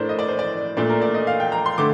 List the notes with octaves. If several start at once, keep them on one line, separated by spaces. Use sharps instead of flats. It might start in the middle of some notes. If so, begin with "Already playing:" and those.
Already playing: A2 A3 D4 A#4 C5
D#5
D5
C5
D5
A#2 A3 D4 D5
A#4
D5
D#5
F5
G5
A#5
C6
D3 A3 D6